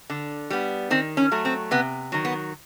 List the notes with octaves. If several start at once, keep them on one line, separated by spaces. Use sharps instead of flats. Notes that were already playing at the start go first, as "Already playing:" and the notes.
D3
G3 B3
D#3 C4
C#4
F#3 A3
C4
C3 B3
D#3 F#3
B3